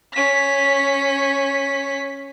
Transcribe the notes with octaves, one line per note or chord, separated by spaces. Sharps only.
C#4 B6